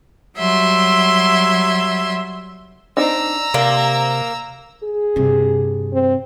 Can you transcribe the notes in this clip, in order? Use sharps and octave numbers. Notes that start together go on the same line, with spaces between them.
F#3 G3 E5 C6 G#6
C4 D4 D#4 A#5 E6
C3 A#3 D5
G#4
G2 C3
C4